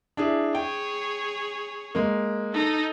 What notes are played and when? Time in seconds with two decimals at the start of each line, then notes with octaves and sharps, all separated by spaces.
0.17 D4 E4 G#4
0.55 G#4 C#5 G5
1.95 G#3 A#3
2.54 D#4 A4